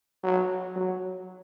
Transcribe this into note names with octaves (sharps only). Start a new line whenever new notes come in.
F#3
F#3